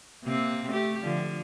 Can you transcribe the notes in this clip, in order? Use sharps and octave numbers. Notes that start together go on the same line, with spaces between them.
C3 A#3 C4
A3 G4
D3 F3